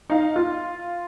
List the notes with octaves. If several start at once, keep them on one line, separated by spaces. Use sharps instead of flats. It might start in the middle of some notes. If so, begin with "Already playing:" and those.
D#4 F5
F4